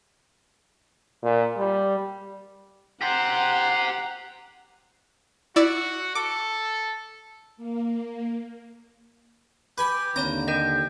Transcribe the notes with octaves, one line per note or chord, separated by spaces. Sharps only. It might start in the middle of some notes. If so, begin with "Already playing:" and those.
A#2
G3
G4 C5 F#5 A#5
E4 F#4 D5 E6
A4 D6
A#3
G4 B4 G#5 B5
D#2 D3 C4 C#5 A#5 B5
A#4 D#5 G5 A#6